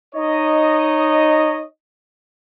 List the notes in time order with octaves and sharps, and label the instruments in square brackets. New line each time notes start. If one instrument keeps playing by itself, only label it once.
[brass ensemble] D#4 C#5 D#5